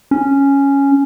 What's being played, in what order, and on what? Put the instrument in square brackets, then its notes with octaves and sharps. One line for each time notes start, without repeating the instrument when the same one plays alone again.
[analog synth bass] C#4